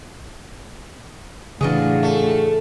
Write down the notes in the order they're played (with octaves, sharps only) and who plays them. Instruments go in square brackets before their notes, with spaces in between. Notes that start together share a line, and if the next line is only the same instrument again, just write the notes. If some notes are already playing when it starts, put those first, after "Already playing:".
[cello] A2 D4 [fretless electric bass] C#3 E3 [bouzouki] F4 F#4 G#4
[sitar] A3